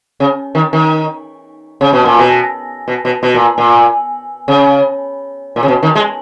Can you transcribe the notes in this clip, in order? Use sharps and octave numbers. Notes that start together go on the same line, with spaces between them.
C#3
D#3
D#3
C#3
B2
A#2
B2
B2
B2
B2
A#2
A#2
C#3
A#2
C#3
B2
D#3
G#3